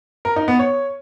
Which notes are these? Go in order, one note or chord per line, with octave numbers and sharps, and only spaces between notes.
A#4
D#4
B3
C#5